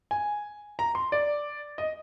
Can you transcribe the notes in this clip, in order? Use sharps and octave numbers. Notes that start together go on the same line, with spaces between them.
G#5
A#5
C6
D5
D#5